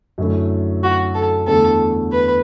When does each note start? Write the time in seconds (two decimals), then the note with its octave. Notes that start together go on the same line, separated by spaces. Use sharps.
0.18 F#2 D3 A3 E4
0.83 F#4
1.15 A4
1.47 E2 D3 A3 A4
2.12 B4